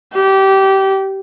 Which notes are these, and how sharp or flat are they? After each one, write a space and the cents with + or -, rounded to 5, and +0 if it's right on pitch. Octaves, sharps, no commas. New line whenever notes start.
G4 -20